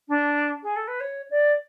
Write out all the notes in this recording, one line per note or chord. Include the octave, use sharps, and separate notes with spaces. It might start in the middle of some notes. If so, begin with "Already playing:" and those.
D4
G#4
A4
B4
C#5
D5